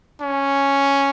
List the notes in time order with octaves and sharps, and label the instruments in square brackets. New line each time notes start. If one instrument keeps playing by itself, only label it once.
[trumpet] C#4